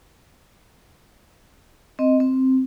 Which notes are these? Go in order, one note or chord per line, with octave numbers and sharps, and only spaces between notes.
C4 D#5
C4